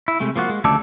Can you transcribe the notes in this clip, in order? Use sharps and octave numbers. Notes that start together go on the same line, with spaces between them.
E4
C3 G#3 A3
F3 A#3 F4 F#4
G#3
D2 C#3 F3 A3 A4 D5